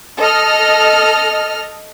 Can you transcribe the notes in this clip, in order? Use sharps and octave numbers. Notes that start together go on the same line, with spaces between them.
A4 D#5 F6